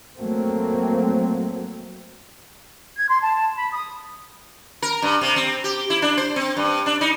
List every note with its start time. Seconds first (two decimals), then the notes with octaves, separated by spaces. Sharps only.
0.17 F#3 A3 A#3 C4
2.96 G#6
3.09 C6
3.22 A5
3.57 B5
3.73 D#6
4.82 A#4
5.02 G2
5.21 C3
5.36 C4
5.64 G4
5.90 E4
6.02 D4
6.18 C5
6.36 C4
6.57 G2
6.86 D4
7.01 D#4